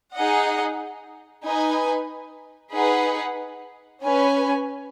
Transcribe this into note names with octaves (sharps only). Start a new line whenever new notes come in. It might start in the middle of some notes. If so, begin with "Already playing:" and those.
D#4 G#4 D#5 F#5
D#4 B4 G#5
D#4 G#4 B4 F#5
C#4 B4 G#5